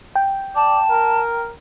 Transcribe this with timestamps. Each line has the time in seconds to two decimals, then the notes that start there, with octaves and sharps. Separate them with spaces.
0.16 G5
0.56 D5 A5
0.90 A#4